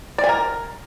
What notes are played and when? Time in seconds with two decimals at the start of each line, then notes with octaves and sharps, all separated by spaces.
0.18 D5
0.24 G#5
0.29 A#4